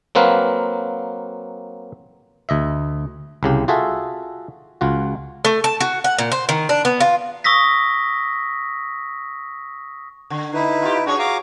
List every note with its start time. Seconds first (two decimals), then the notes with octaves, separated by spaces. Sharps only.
0.15 F#3 A#3 C4 B4 F5
2.49 D2 D#5 E5
3.43 C2 C#3 G4
3.68 F4 F#4 G#4 A4 E5
4.81 C#2 F4 F#4
5.45 A3
5.64 A5
5.80 F#4
6.04 F#5
6.18 A#2
6.32 C5
6.49 D#3
6.69 D4
6.85 B3
7.00 F4
7.44 C#6 D#6 E6 A#6 B6
10.30 D3
10.54 D#4 E4 B4
10.82 F4 G4
11.06 D4 F#4 G#4 C#5
11.19 F5 A#5 D6